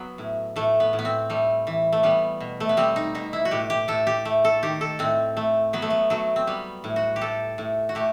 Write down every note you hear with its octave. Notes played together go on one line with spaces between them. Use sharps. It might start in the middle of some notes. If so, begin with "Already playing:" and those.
Already playing: F#3 B3
A2
A2 A3
B3
A2
B3
C4
G3 A3
E3
A3
G3 B3
B2
A3
B3
G3 C4
D#4
B2 D#4
E4
F#4
A2 G4
G4
A2 A4
G4
A3
A4
D#3 G4
A4
A2 C4
A3
F#3 B3
A3
B3
F#3 A3
C4
G3 B3
A2
F#4
G4
A2 A4
A2
F#4
A3 G4